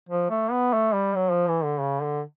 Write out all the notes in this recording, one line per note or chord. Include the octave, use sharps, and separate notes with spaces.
F3
A3
B3
A3
G3
F#3
F3
E3
D3
C#3
D3